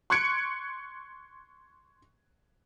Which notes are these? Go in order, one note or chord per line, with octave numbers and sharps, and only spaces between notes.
C6 C#6 F#6 G#6 C#7 D7